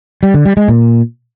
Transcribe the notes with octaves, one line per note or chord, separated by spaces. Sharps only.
G3
D3
G3
G#3
A#2